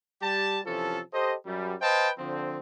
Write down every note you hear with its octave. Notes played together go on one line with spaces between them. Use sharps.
G3 G4 A5
C3 E3 F3 C#4 A4
G4 A4 C5 D#5
F#2 G3
B4 C5 D#5 F5 G5 A5
D3 F3 C4